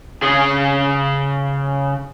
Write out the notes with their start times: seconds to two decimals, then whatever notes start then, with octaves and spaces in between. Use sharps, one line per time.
0.22 C#3 G#4